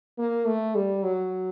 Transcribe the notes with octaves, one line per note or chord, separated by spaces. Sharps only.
A#3
A3
G3
F#3